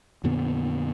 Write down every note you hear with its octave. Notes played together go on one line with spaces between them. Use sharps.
F2 A#2 D3 B3